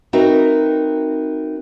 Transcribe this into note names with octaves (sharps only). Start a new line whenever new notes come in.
C4 D#4 F#4 A#4 B4 E5